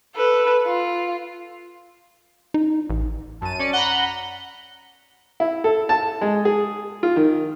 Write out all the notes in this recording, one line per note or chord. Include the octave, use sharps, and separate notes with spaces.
A4 B4
F4
D#4
A1
F#2 A5 D#7
C#4 D5 C#7
F#5 A#5 B5 G7
E4
A4
A5
G#3
G#4
F4
D#3